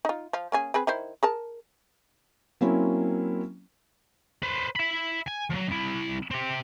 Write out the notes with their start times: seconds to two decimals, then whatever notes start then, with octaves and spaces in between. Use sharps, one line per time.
0.05 D#4 F4
0.33 F3 F5
0.52 A#3 C#4 G#4
0.74 C4 G#4 B4
0.87 D#3 E4 C5
1.23 G#4 A#4 A5
2.61 F#3 A#3 C4 C#4 E4
4.42 B4 C5
4.75 E5 B5
5.28 G#5
5.51 F3 F#3
5.70 C2 E4
6.31 C4 G4